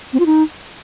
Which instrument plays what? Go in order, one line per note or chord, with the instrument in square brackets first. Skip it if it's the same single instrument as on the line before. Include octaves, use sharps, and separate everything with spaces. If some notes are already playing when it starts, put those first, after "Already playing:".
[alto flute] C4
F4
D#4